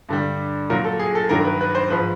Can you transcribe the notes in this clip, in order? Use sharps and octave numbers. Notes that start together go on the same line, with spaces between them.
G2 D3 G3
A#2 F#3 A#4
A4
G#4
A4
G2 D#3 F#3 A#4
A#4
B4
B4
C5
G#2 F3 B4